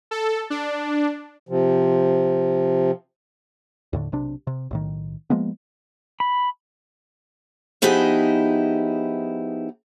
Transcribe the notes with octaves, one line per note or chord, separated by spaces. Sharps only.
A4
D4
C3 F3
D#2 A2 D3
B1 C3 D4
C3
B1 A2 D#3
F3 G#3 A#3 B3
B5
F3 B3 D#4 E4 G4 G#4